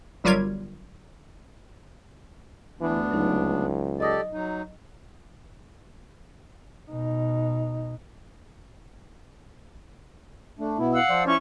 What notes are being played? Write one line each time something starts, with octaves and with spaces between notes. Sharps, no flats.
G1 F#3 G3 F4 A#4 G#6
D2 E3 B3 D4
C#2 F#3 D#4
G4 A4 D5 D#5 D#6 A#6
F#3 D#4
B2 D#4
A3 D4
B2 B3 E4
F5 F#5 E6
F3 C5 D5
C#4 E4 C#6